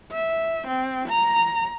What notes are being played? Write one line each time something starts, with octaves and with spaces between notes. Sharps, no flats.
E5
C4
A#5